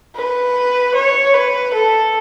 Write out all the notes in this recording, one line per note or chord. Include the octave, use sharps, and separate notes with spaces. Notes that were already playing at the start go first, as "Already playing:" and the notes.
B4
C#5
B4
A4